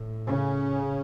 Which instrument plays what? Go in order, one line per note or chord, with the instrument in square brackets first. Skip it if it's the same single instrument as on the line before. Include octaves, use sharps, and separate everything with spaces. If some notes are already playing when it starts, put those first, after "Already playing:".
Already playing: [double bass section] A2
C#3 C#4